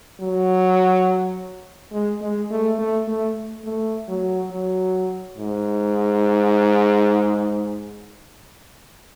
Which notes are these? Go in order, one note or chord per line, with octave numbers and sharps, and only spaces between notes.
F#3
G#3
G#3
A3
A3
A3
A3
F#3
F#3
G#2